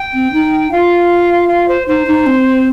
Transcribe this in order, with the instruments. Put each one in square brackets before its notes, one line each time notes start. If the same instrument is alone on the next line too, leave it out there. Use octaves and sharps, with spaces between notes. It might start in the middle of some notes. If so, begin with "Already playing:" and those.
Already playing: [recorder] G5
[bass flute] C4
D#4
[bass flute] F4 [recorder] F5
[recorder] F5
C5
[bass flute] D#4 [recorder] C5
[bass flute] D#4
C4